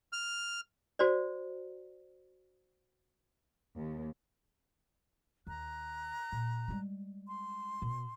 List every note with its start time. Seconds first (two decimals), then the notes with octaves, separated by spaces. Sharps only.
0.13 F6
0.99 F#4 C5 D5
3.77 D#2
5.47 D#2 A#5 F#6
6.32 A#2
6.68 G3 G#3
7.27 C6
7.82 B2